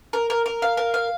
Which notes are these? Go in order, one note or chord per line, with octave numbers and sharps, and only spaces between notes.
A#4
A#4
A#4
F5
A#4
F5